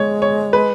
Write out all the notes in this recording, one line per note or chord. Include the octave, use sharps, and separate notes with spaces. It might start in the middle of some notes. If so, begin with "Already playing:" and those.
Already playing: G#3 C#5
C#5
B4